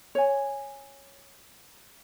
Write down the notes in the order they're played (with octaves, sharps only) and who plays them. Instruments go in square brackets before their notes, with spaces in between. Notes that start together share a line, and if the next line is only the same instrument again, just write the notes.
[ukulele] C#5 G#5